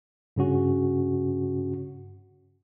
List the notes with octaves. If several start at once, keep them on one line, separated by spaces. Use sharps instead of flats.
G2 C#3 C#4 F#4